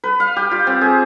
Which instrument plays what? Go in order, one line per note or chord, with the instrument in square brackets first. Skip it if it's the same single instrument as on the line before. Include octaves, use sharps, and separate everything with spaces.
[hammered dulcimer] B4
F5
G4
F4
C4
G#4